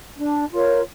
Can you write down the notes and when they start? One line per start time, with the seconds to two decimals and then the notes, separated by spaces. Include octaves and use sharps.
0.17 D4
0.52 F4 A#4 C#5